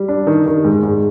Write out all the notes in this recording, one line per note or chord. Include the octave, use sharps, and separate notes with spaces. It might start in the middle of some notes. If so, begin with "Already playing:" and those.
Already playing: G3
D4
D#3
D#3
G#2
G#2